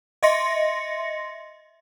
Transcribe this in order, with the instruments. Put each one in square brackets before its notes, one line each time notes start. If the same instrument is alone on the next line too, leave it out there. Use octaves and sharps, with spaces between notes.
[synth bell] D#5 E5 C6 A#6 C#7